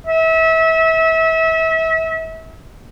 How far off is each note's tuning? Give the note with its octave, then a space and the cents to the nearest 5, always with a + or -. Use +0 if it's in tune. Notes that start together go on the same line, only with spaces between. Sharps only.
E5 -30